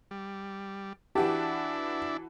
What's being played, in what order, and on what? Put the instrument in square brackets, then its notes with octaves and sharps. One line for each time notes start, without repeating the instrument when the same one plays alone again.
[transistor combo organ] G3
[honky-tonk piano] E3 F#4 A5 [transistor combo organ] D4 E4 [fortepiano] G4